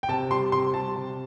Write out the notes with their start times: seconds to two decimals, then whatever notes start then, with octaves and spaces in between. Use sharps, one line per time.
0.03 G5
0.08 C3 A5
0.31 G3 C6
0.52 C3 C6
0.74 G3 A5
0.96 C3